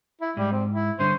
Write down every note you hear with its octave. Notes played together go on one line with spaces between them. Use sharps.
E4
G#2 G3
C4
E4
G2 D3 C#4 C5